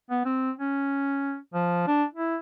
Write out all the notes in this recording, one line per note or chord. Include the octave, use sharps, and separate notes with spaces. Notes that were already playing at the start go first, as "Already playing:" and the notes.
B3
C4
C#4
F3
D4
E4